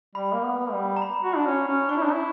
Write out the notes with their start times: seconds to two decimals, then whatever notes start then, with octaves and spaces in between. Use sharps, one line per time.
0.15 G3 B5
0.33 A#3
0.43 B3
0.72 G3
0.97 A#5
1.02 B5
1.23 F#4
1.36 D4
1.46 C#4
1.68 C#4
1.89 D4 C#6
1.97 E4
2.04 D4
2.12 E4